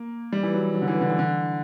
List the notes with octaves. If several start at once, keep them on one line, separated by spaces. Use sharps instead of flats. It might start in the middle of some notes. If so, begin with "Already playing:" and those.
Already playing: A#3
G3
E3
F#3
F#3
D3
E3
D3
E3
D3